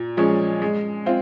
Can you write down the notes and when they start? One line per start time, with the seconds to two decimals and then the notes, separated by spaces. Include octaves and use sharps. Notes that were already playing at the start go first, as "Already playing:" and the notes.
Already playing: A#2
0.17 F3 G#3 C#4 G#4
0.62 G#3
1.06 C4 F4